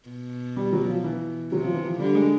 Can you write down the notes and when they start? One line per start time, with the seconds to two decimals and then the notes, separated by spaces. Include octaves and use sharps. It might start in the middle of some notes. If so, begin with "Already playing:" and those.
0.09 B2
0.56 G3
0.73 F#3
0.88 F3
1.04 E3
1.52 C3 F#3
1.63 F3
1.74 E3
1.85 F3
1.99 D3 G3
2.15 G#3